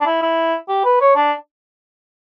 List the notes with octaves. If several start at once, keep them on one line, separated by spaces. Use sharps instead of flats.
D4
E4
E4
G4
B4
C#5
D4